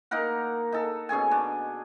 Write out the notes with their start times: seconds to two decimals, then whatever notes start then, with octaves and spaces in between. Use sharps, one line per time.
0.11 A#3 D#4 A#4 F#5
0.72 D#4 A4
1.09 B2 C#4 G#4 G#5
1.31 D4